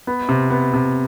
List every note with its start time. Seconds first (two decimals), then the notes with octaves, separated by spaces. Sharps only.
0.07 B3
0.29 C3
0.51 B3
0.73 C3